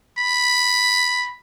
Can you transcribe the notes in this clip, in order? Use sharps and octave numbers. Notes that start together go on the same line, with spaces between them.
B5